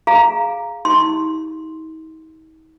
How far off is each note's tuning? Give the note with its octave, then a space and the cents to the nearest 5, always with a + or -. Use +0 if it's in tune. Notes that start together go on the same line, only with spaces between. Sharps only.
G#4 +5 F5 +0 A#5 +0
D#4 +40 G4 +0 C6 +0